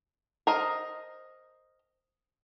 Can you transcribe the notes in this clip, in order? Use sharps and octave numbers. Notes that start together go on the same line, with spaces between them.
A#4 C5 D#5